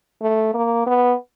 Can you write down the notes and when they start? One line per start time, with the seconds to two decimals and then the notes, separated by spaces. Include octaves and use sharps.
0.22 A3
0.54 A#3
0.86 B3